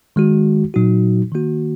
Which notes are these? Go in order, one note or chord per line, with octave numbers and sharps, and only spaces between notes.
D#3 G#3 F#4
A#2 F#3 D#4 F#4
D#3 A#3 F#4